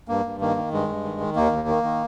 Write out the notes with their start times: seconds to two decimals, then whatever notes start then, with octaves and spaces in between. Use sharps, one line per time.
0.08 G2 A#3
0.25 G2
0.41 D#3 A#3
0.56 D#3
0.72 G2 G#3
0.88 G2
1.04 D#3
1.20 D#3
1.36 D#2 A#3
1.52 D#2
1.68 D#3
1.83 D#3